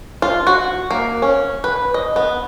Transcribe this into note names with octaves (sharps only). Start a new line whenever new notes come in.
F4
F#4
A#3
C#4
B4
D#5
B3